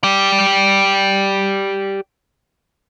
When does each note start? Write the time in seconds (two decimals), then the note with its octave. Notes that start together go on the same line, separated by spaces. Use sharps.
0.04 G4 D5